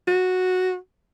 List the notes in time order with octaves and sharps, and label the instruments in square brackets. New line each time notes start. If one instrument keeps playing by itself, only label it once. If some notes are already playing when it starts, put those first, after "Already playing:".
[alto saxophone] F#4